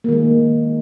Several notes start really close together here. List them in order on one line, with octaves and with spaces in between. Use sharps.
A#3 D#3 G#3